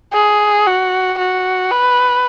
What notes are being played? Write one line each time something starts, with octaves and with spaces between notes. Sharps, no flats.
G#4
F#4
F#4
B4